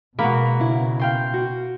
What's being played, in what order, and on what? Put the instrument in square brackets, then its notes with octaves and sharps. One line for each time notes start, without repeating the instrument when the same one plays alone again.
[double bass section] B2 [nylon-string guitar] G#3 [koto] A#3 [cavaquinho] F#4 A#5 B5
[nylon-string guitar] C#3 E4
[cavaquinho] F5 G5 C6
[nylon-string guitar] F#4